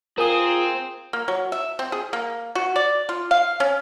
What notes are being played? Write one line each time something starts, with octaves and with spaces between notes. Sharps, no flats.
C4 F4 G#4 A#4 G#5 D#6
A#3
F#3
E5
C4
G#4
A#3
F#4
D5
F4
F5
C#4